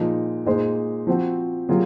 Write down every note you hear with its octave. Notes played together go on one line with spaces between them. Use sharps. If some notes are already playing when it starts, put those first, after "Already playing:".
Already playing: A#2 F3 G#3 D#4
A#2 G#3 D#4 G#4 C5
F3 C4 F#4
C3 F#3 A#3 F4 G#4